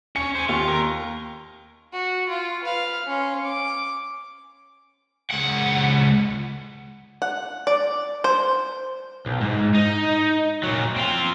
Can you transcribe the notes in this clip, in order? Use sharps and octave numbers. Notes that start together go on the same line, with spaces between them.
C#4 C#7
C5 G#5
D#2 F4
A#4
F#4
F4
B4 F5
C#4 C6
D6
C#2 F#5
F#5
D5
C5
B1
G#2
D#4
A#2 F#3
C4 F4